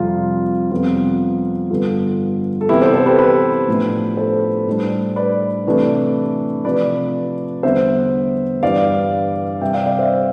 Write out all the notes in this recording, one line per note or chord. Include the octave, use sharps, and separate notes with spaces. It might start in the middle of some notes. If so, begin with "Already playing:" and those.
Already playing: F2 C3 G3 F4
F2 C3 G3 B3 F4
G2 D3 G3 B3 F4 A4
A4
C3 E3 B3 E4 G4
A4 C5
A4 C5
G4 B4
G4 B4
A2 F3 B3 D4
A4 C5
A2 G3 D4
B4 D5
C3 E3 A3 D4
C3 F3 A3 B4 D5
E2 D3 G3 B3 C5 E5
G2 E3 G3 D5 F5
C3 G3 C4 E5 G5
D5 F5
D5 F5
C5 E5